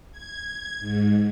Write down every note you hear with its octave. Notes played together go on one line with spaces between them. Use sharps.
G#6
G#2